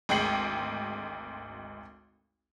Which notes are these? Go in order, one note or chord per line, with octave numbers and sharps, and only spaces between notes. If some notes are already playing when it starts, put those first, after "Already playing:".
G#1 D2 G#3 G5 C7 F#7